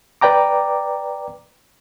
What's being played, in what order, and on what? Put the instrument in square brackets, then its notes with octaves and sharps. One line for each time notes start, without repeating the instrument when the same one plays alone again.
[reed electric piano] B4 D5 G5 A#5 D6